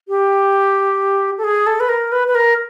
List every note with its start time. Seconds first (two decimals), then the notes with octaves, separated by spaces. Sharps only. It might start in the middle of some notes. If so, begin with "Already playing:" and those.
0.08 G4
1.38 A4
1.44 G#4
1.67 A4
1.80 B4
1.89 A#4
2.12 B4
2.28 B4
2.35 A#4